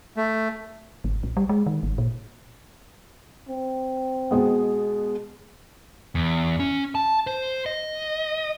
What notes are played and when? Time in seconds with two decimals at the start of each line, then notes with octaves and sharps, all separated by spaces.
0.17 A3
1.04 G#1
1.23 A#1
1.37 G3
1.49 G#3
1.66 D#3
1.83 G#1
1.98 A#2
3.49 C4
4.31 B2 G#3 B3
6.15 E2
6.60 C#4
6.95 A5
7.27 C5
7.66 D#5